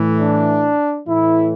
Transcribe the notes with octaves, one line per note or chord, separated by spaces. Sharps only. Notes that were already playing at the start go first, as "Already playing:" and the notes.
Already playing: A2 E3
D4
A2 E3 E4